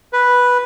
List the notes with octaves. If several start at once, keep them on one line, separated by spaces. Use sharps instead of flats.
B4